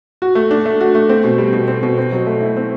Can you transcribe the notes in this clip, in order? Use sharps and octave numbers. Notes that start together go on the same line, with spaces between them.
F#4
A3
D4
A3
F#4
A3
C4
B2
G3
B2
C4
B2
C4
F#3
A3
E4
C4